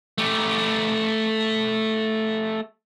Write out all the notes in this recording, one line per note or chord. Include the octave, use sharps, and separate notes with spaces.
A3 G4